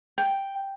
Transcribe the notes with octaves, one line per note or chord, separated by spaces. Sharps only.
G5